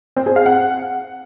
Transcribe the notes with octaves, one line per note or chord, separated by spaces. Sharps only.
C4
G#4
F5
F#5